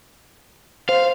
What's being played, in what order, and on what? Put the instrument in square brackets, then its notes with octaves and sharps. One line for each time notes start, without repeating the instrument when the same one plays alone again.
[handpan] C5 [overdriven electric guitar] F5